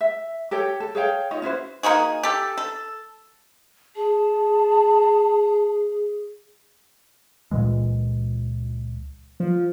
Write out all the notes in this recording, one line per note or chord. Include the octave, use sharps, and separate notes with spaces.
E5
G4 A4 C#5 G5
A4
G#4 C#5 F5 G5
D#4 F4 C#5 D#5
C#4 E4 F#4 C5
A#3 D#4 F#4 G#4
G4 A4
A4
G#4 A5
C#2 A#2 E3 G#3
F3